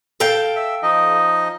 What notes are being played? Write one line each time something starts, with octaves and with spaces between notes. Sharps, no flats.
A4 F5 G5
E5
F3 D#4 D#5